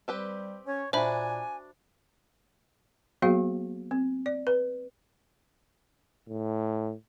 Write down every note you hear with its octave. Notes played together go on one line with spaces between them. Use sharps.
G3 C4 G4 B4
C#4 C#5
A#2 D4 F#4 C5 E5 G#5 B5
F#3 A#3 B3 F#4 G#4 F5
C4
D5
B4
A2